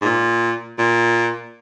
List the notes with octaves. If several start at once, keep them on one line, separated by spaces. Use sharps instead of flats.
G#2
A#2
A#2